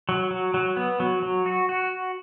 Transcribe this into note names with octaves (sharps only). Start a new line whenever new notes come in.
F#3
F#3
F#3
B3
F#3
F#3
F#4
F#4